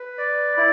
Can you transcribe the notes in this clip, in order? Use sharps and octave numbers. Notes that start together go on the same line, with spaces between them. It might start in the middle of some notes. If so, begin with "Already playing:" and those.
Already playing: B4
D5
E4